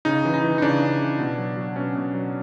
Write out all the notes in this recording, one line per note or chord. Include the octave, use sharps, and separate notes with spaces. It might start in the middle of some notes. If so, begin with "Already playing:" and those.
C#3 D#4
E3
D#4
E3
D#4
C#3 D4
C#3
E3
B2
F#3
F#3
B2 C#4
B2
F#3